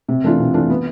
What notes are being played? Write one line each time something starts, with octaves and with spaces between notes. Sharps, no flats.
C3
E3 A3 D4 F4
C3
E3 A3 D4 F4
B3